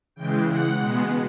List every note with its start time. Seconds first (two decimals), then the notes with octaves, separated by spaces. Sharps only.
0.16 C#3 E3 G#3 G5
0.47 F#5
0.79 B2 G#3 B3